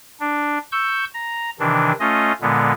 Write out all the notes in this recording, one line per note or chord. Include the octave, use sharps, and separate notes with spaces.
D4
C#6 E6 G6
A#5
C3 D#3 E3 D4
A3 C#4 F4 D#5
A#2 D3 G#3 B3